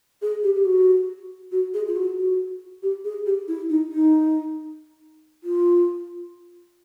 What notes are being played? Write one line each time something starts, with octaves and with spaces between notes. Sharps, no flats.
G#4
G4
G4
F#4
F#4
G#4
F4
F#4
F#4
G4
G#4
G4
E4
D#4
D#4
F4